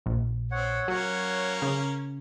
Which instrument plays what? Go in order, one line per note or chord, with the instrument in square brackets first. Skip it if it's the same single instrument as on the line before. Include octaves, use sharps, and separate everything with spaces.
[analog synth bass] A#1
[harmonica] C4 [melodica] C#5 F#5
[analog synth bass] F#3 [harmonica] A#3 C#4 A#4
[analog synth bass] C#3